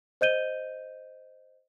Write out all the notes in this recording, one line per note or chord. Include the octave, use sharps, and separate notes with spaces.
C5 D#5 G6 D#7 G7